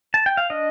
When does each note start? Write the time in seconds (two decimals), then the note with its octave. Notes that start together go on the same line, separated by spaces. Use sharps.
0.14 A5
0.26 G5
0.37 F5
0.50 D4 D#5